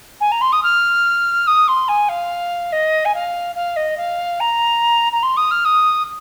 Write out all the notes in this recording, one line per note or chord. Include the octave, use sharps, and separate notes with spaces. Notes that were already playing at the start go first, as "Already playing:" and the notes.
G#5
A#5
C6
D#6
F6
D#6
C6
G#5
F5
D#5
G#5
F5
F5
D#5
F5
A#5
A#5
C6
D#6
F6
D#6